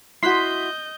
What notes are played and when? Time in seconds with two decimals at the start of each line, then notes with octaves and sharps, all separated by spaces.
0.23 E4 F#4 D#5 C6 G6 B6